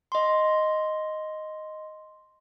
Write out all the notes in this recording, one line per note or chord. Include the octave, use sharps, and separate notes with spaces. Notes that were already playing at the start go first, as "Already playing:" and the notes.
D#5 C6